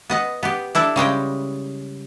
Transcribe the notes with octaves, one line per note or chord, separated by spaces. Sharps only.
B3 D#5 F#5
B3 G4
D4 E4 A4
C#3 G3 G#3 G5